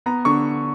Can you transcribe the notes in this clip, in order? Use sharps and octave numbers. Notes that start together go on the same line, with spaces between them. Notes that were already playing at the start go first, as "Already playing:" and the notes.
B3 A#5
D3 C#6